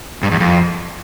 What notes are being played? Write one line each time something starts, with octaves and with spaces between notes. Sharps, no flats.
G2
E2
F2